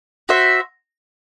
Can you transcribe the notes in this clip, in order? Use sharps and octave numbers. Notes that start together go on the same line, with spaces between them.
F#4 C5 E5